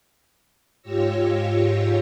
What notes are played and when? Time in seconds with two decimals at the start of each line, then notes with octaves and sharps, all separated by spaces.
0.82 G#2 F4 G4 C#5 E6 A#6